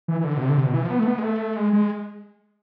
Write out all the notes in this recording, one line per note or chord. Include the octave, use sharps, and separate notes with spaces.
E3
E3
D3
B2
C3
D3
C3
B2
E3
F3
B3
A3
B3
G#3
A3
G#3
G#3